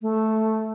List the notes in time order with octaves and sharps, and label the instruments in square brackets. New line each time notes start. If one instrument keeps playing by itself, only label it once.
[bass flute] A3